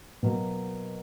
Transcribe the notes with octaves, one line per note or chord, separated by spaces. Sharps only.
B2 F#3 A#3